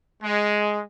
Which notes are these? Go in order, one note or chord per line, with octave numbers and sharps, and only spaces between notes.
G#3